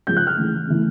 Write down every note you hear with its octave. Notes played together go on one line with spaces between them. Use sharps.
C#3 F3 G#3 G6
F#6
F6
C#3 E3 A3
C#3 E3 A3